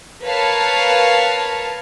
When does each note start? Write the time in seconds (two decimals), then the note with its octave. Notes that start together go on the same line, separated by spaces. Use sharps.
0.24 A#4 B4 C#5 F5 A5